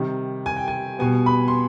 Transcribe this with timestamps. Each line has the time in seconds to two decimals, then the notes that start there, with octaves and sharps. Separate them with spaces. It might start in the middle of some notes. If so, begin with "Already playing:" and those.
Already playing: C3 D#3 G3
0.46 G#5
0.56 G5
0.68 G#5
0.99 B2 G3 B3 G#5
1.26 B5
1.48 C6